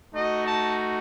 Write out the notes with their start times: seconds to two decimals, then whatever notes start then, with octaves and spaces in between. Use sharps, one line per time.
0.13 A3 D#4 F#4 D#5
0.46 A5